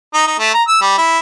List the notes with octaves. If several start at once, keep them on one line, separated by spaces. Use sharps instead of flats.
D#4
D#4
A3
A#5
E6
G3
E4